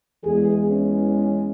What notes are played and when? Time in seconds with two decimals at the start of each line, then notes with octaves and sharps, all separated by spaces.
0.24 E2 E3 G#3 G#4
0.69 C#4